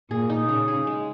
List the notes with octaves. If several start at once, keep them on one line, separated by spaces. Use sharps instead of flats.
A#2 G#4
D#4
C#3 G#4
G#4
G#3